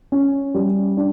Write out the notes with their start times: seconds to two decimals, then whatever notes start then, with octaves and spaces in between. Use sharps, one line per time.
0.12 C#4
0.54 G3
0.97 D4